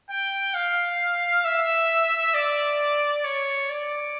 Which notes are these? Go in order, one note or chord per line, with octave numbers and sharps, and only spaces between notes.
G5
F5
E5
D5
C#5
D5